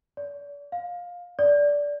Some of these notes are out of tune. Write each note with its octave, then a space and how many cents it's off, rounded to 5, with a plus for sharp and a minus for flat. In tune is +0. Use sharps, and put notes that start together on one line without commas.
D5 -40
F5 +15
D5 -15